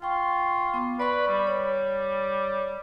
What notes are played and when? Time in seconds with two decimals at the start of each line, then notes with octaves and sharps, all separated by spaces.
0.02 F4 G5 C#6
0.74 B3 D6
1.00 B4 D5 C#6
1.28 G3
1.47 C#5